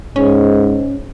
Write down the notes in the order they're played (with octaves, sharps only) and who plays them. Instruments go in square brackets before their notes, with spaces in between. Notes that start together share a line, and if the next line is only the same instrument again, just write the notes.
[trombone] G#2 [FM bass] C#4